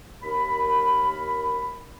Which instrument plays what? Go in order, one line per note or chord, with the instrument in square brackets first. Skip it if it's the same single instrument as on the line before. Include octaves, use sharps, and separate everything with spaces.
[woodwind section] D#2 A#4 B5